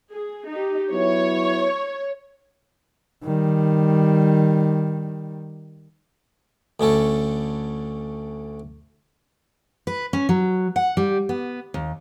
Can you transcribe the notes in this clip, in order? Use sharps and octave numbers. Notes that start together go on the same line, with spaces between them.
G#4
D#4 G4
F#3 B3 E4 C#5
D#3 G3
D2 D3 C#4 A4
B4
C#4
F#3
F#5
G3
B3
D#2